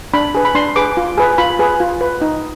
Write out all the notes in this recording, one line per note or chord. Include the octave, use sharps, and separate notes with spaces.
D4 B5
G#4 B4
B5
D4 C6
G#4 B4 D6
F4
G#4 B4
F4 B5
G#4 B4
F4
B4
D#4